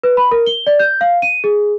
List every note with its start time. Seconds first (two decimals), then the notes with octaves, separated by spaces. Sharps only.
0.04 B4
0.17 B5
0.31 A#4
0.46 G7
0.67 D5
0.79 G6
1.01 F5
1.22 D#7
1.44 G#4